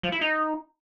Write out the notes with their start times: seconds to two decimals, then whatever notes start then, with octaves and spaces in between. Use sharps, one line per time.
0.03 F3
0.12 E4
0.21 D#4